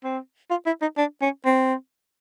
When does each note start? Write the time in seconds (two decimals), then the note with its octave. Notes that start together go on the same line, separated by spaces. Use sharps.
0.04 C4
0.51 F4
0.66 E4
0.82 D#4
0.97 D4
1.22 C#4
1.45 C4